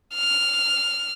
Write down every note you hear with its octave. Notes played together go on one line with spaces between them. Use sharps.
F6